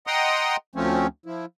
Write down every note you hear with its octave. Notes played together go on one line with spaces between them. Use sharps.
D#5 F#5 G5 A#5 C6 D#6
D2 F3 A3 C4 C#4
F3 E4